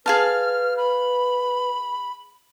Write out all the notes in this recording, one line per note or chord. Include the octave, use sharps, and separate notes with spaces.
G#4 B4 F5 A5 F6
B5